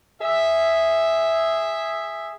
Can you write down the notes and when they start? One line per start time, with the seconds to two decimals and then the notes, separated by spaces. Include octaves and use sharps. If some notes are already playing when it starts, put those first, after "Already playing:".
0.20 G#4 E5